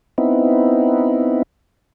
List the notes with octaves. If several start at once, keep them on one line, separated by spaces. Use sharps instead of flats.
B3 C4 D#4 E4